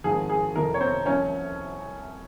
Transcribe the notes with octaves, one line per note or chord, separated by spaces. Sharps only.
G#1 G#2 F3 G#4
G#4
F1 F2 E3 A#4
C#5
C4 C5
C2 C3 F3 C#4 C#5